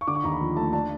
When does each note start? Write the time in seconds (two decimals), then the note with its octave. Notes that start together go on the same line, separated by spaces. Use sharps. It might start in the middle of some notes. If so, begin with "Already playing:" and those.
0.01 C#6
0.07 D3 D6
0.15 C#6
0.24 D#2 A#5
0.32 B5
0.40 F3
0.56 A3 A5
0.73 D4 A5